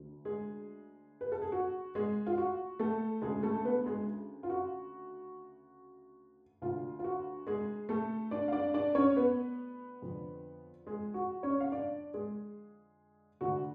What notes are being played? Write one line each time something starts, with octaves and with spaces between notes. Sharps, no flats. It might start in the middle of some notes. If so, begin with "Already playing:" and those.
Already playing: D2 D3
G#3 G#4
B4
A4
G#4
F#4
G#3 G#4
F4
F#4
A3 A4
D2 C#3 G#3 G#4
A3 A4
B3 B4
G#3 G#4
F4
F#4
D2 D3 F4
F4
F#4
G#3 G#4
A3 A4
D4 D5
F5
D4 D5
D4 D5
C#4 C#5
B3 B4
F2 D3
G#3 G#4
F#4
C#4 C#5
F5
D4 D5
G#3 G#4
D2 D3 F#4